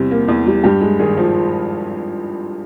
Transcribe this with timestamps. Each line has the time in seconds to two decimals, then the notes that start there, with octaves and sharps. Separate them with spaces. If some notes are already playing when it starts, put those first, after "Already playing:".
Already playing: E2 C3 G3
0.11 A#3
0.28 E2
0.46 G3
0.64 G2 G4
0.81 G#3
0.99 G#1 G#4
1.17 F3